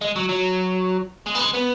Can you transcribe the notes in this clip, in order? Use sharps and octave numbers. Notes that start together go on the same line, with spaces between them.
G#3
F#3
F#3
G#3
B3
G#3
B3